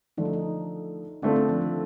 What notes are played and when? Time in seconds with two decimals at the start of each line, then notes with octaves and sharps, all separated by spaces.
0.18 D3 F3 A3 D#4
0.25 D4
0.33 D#4
1.22 D3 A3 C4 D4 F4
1.36 D4
1.49 F3
1.62 D#3